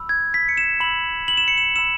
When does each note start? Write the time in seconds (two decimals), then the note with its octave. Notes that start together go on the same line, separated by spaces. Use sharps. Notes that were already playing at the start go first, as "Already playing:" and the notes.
Already playing: B5 E6
0.09 G#6
0.34 B6
0.49 C#7
0.57 E7
0.80 B5 E6 F#7
1.28 F#7
1.37 E7
1.48 C#7
1.58 E7
1.76 B5 E6 E7